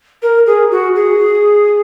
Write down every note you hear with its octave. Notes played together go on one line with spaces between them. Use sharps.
A#4
G#4
F#4
G#4